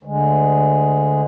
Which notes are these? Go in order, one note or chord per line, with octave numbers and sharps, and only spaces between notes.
D2 D3 G#3